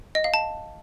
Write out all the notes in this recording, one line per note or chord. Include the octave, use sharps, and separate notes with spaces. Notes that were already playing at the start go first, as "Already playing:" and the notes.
D#5
F5
A5